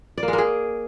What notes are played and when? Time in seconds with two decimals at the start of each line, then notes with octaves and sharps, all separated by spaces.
0.18 D5
0.23 A#3
0.28 G#3
0.33 A#3
0.38 G#4